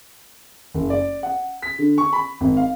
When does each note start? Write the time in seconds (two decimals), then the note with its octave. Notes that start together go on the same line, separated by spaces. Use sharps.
0.74 F#1
0.90 D5
1.23 F#5
1.62 B6
1.78 D3
1.98 C#6
2.13 B5
2.41 G#1
2.57 F5